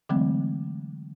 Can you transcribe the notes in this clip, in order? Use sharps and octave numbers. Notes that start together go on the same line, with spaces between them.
D3 E3 F#3 G#3 A3 C4